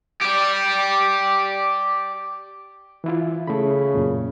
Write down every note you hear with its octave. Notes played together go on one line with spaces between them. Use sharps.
G4 D5
E3 E4 F4
C#3 A3 B5
F#2 A#2